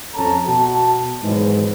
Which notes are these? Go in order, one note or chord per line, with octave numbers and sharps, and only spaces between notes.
F2 C#4 A4 A5 A#5
B2 F#4 A5
G#2 B2 D#3 E3 F#3 G#3